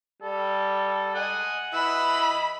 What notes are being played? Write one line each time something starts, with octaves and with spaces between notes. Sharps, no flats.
G3 A4
D#5 F#5 G#5
E3 D#5 B5 E6